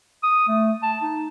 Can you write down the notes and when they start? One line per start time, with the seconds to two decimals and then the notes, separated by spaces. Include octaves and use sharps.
0.23 D#6
0.48 A3
0.83 A5
1.02 D#4